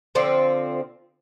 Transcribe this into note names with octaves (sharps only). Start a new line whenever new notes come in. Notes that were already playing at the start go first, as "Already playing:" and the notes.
D3 F3 C4